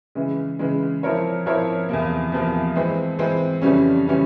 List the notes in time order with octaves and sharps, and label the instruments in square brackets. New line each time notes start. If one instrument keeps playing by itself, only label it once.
[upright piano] C#3 E3 G#3
C#3 E3 G#3
F3 C4 E4 A#4 C#5
F3 C4 E4 A#4 C#5
E2 C3 F3 A#3
E2 C3 F3 A#3
E3 G#3 C4
E3 G#3 C4
F2 C#3 E3 G3 C#4
C#3 E3 G3 C#4